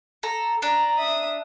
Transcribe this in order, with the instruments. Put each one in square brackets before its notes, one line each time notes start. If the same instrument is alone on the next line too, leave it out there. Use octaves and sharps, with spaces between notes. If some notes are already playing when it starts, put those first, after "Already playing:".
[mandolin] A4 A#5
[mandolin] D4 [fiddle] A#5
[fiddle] E5 D#6